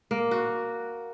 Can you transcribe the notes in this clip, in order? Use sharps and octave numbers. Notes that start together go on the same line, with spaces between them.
A#3
F#4